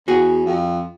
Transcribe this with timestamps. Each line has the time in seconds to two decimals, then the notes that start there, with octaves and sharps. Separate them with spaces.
0.08 E2 F#4 G#4
0.46 F2